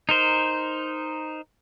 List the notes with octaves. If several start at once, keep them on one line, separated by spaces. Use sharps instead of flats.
D#4 A#4 C5